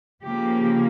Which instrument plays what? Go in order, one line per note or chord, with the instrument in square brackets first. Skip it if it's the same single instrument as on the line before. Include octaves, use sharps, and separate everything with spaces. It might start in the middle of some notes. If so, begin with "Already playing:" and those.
[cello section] C#3 F3 A#3 G4